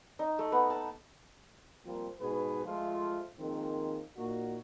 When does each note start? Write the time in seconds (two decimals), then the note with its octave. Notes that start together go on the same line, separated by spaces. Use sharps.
0.19 D#4
0.39 A3
0.52 B3
0.70 A5
1.86 F3 G3 A#3 C4
2.20 G#2 B2 G#4 B4
2.65 F3 G#3 A3 F4
3.39 D#3 F3 G#3 A#3 C4
4.17 A#2 A#3 D#4 F#4